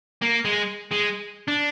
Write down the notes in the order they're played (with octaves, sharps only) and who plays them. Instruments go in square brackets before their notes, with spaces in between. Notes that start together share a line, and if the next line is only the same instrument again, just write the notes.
[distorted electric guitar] A#3
G#3
G#3
D4